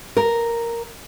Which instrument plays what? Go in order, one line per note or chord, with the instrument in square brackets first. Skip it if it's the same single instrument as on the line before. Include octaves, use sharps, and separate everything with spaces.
[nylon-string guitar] A#4